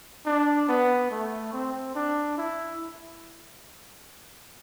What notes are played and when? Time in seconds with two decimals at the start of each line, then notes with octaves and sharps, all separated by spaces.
0.26 D4
0.69 B3
1.11 A3
1.53 C4
1.95 D4
2.38 E4